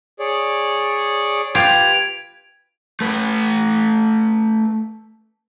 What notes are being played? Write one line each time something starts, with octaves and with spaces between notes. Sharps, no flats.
G#4 C#5 D5
F4 G4 B4 G#6 D7 F7
A3 B4